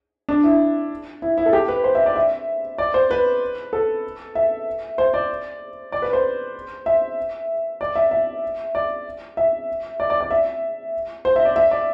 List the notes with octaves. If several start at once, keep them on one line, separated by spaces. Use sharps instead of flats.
D4
E4
E4
E4
A4
G4
B4
C5
E5
D5
E5
D5
C5
B4
A4
E5
C5
D5
D5
B4
C5
E5
D5
E5
E5
D5
E5
D5
D5
D5
E5
C5
E5
D5
E5
D5